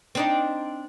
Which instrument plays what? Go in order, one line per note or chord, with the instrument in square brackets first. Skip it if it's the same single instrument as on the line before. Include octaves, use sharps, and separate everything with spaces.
[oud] C4 D4 D#4